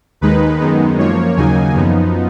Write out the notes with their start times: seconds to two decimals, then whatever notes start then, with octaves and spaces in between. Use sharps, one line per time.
0.21 D#2 D#3 G#3 D#4 B4
0.60 F#2 D#3 G#3 B3 D#4
0.98 F#2 F3 A#3 C#5
1.37 D#2 C#3 F#3 A#3 D#4 G#5
1.76 F#2 F3 B3 D#4